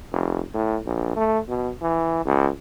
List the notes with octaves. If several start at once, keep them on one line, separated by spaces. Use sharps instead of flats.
F1
A2
A#1
A3
B2
E3
C#2